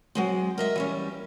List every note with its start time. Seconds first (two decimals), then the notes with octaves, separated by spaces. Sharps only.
0.15 F#3 G#3 C4
0.58 A#4 D#5 E5
0.76 E3 G3 C#4